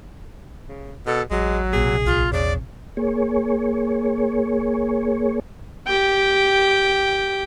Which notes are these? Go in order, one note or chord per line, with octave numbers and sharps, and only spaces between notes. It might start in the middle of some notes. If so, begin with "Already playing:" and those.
C#3
B2 A4
A1 F#3 G#3
A#1 C3 G#4
C2 F4
E2 C#3 D5
A#3 G#4 C#5
G4 G5